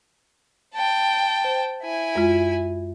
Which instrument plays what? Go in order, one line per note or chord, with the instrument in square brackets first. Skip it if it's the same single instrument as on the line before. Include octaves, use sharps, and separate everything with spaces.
[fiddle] G5 A5
[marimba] C5
[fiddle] E4 G#5
[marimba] F#2 G#3 F4